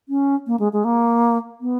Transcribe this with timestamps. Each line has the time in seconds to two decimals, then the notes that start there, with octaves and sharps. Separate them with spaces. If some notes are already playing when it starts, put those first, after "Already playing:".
0.09 C#4
0.47 A#3
0.60 G#3
0.73 G#3
0.85 A#3
1.61 B3